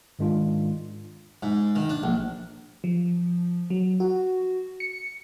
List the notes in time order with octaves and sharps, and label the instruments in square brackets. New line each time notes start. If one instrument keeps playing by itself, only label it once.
[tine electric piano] G#2 D#3 G#3 D4 F4
[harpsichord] G#2
D#3
D4
A#1
[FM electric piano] F3
F#3
F#4
C#7